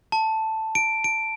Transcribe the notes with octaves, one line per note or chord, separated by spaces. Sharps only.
A5
D7
D7